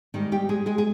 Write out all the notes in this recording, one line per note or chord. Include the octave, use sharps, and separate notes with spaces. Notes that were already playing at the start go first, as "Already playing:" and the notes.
G#2 D#3 G3 D#4
G3 G4
G#3 G#4
G#3 G#4
G#4